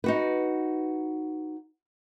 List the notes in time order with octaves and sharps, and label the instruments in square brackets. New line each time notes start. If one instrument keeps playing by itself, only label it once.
[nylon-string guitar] D#4 F#4 B4